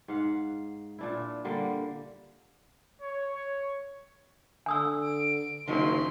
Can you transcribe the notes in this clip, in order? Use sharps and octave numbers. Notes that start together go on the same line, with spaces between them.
G#2 F5 F#5
A#2 D4 E4
D3 G3 A#3
C#5
C#5
D3 G#5 D#6 E6
D7
F#1 D#3 F3 F#3 E4 C6